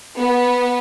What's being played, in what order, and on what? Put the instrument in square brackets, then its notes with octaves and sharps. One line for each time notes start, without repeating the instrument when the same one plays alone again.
[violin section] B3